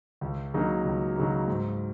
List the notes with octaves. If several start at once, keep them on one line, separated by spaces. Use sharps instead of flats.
C#2
C#3 F#3 A#3 D#4
C#2
C#3 F#3 A#3 D#4
G#2